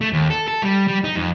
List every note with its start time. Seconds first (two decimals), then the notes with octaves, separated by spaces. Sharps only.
0.01 A3
0.13 D#2
0.30 A4
0.48 A4
0.63 G3
0.88 G3
1.04 D#4
1.16 F2